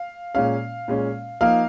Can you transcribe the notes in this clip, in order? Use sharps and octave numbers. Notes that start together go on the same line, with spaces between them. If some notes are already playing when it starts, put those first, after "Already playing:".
Already playing: F5
A#2 G#3 C#4 F5
A#2 G#3 C#4
F3 A#3 D#4 F5